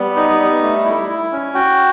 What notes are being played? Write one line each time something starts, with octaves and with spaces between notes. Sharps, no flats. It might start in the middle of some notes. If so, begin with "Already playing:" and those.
Already playing: G3 B3
D#4
G3
A3
E4
E4
C#4
F#4 G5